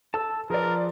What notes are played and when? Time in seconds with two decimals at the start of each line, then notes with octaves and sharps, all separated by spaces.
0.14 A4 A5 E6
0.50 F3 G#4 A#4 B4 D5